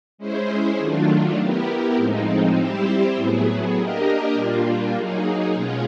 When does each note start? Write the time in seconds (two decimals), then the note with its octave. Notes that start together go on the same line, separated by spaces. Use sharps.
0.18 G#3 C#4 E4 G#4 C5
0.78 D#3 F#3 A3 D4 F4
1.37 B3 E4 G4 A#4
1.97 A2 F3 G#3 C4 D#4
2.56 G3 C4 E4 G4 C5
3.15 A2 F#3 B3 E4 G#4
3.75 A#3 D4 G4 A#4 D#5
4.34 A#2 G3 A#3 D4 F4
4.93 F#3 A#3 D#4 G#4
5.53 B2 G#3 C#4 F4 G#4